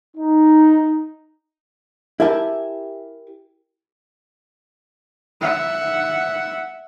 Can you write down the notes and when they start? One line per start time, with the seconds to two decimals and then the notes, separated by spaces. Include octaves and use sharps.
0.17 D#4
2.20 E4 G4 A#4 E5 G#5 A5
5.41 E5 F#5